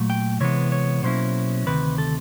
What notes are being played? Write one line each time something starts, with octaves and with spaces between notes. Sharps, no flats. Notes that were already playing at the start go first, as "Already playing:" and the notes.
Already playing: A#2 F#3 A3
G5
C3 E3 G#3 B3 C#5
C#5
B2 F#3 A#3 C#4 E4 C5
D2 C3 D#3 B4
A4